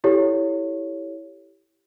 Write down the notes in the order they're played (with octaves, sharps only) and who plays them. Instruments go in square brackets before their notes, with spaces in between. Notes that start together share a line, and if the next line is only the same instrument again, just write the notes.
[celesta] E4 G4 A4 C#5